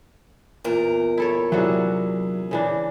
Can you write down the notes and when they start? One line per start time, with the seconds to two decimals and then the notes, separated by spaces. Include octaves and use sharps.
0.64 E2 A#2 A#4
1.18 E4 A4 C#5
1.52 C3 F#3 D4 E4 F#4 G#4
2.51 C#3 E3 D4